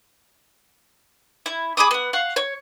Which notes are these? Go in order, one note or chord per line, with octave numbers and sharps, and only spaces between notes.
E4
G#4 B5 D6 D#6
B3 F#5
F5 F#5 C#6
C#5